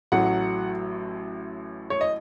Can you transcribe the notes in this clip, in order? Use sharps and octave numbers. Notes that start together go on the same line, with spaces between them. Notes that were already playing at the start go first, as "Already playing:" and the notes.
A1 A2 F#3 A3 F#5
C#5
D#5